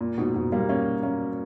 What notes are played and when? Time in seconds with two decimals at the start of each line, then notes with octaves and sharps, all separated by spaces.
0.01 A#2
0.18 G#2 B2
0.34 G#2 B2
0.52 G3 A#3
0.69 A#3 C#4
1.03 A#3 C#4